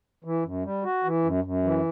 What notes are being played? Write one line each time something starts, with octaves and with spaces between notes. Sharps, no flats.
E3
F#2
G3
F#4
E3
F#2
F#2
E3